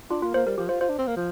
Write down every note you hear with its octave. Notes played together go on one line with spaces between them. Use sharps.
D4 F4
A#3 F4
A#3 C5
G3 A#4
F3 G4
F4 C5
F4 C5
D4
C4
A#3
F3